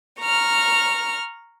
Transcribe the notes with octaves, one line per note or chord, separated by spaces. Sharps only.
A#5 C#6 F6